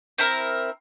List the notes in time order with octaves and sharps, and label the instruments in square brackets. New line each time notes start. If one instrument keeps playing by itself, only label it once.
[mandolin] C4 E4 A#4